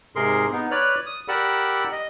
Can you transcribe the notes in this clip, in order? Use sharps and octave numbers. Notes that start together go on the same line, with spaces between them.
G#2 C3 G#4 A#4 C6
B3 D#4
B4 C#5 D5 F6 F#6
D#6
G4 A#4 D5 F#5 B5 E6
D#5